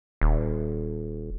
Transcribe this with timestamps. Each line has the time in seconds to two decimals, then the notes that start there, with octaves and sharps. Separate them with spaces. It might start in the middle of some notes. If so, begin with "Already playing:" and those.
0.21 D#1